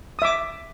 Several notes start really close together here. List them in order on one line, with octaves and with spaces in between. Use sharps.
D#6 E5 D6